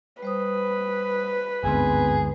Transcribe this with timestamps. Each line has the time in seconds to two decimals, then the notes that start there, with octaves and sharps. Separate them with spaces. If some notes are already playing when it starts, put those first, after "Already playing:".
0.22 G3 B4 C5 D#6
1.64 G1 D2 G#2 B3 C4 G#4